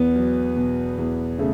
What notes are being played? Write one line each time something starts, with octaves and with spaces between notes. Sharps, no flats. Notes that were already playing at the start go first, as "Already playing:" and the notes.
Already playing: E2 B3
F#3
B2
E2
C#3 A3